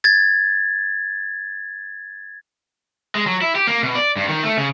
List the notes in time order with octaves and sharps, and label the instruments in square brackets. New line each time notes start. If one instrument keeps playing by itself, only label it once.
[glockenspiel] G#6 A6
[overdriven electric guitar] G#3
F#3
E4
G4
A#3
B2
D5
G2
D#3
A3
C#3